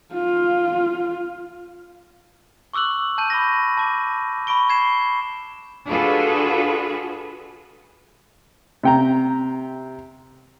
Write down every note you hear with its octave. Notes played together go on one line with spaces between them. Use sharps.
F4
C#6 D6 E6 F#6 F#7
A5 G6 D#7
B5 C#6 D6 A#6
A5 D6
B5 C#6 D7 G7
G#6 C7 E7
D4 F4 F#4 G#4 A4 B4
C3 G5 A#5